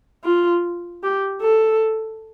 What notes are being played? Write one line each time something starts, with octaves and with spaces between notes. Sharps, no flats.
F4
G4
A4